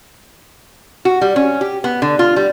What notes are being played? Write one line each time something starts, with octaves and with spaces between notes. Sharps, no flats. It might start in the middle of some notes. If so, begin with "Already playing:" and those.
F#4
G3
C#4
G4
B3
D3
F4
G3